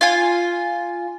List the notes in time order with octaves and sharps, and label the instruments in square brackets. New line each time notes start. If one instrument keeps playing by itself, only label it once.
[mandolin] F4 G#5